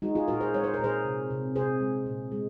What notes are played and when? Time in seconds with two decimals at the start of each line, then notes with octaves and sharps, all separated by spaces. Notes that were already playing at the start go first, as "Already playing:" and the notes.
0.02 G#3 D#4 F#4
0.15 F4 G#4
0.28 A#2 F#4 A#4
0.40 G#4 C5
0.54 G#3 C#5
0.64 C5
0.74 A#2 A#4
0.84 G#4 C5
1.05 C3
1.30 C3
1.56 C3 G#4 C5
1.80 G#3
2.06 A#2
2.32 G#3